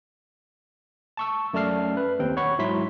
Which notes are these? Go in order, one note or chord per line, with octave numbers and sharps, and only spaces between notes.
A5 C#6 E6
F#2 A3 D5 A5 F6 C7
B4
D#2 C4 G5
C#5 F#5 B5 C#6
G#2 F#3 E4 C6 B6